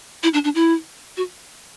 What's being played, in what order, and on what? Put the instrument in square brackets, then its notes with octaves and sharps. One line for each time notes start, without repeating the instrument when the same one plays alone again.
[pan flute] E4
D4
D4
E4
F#4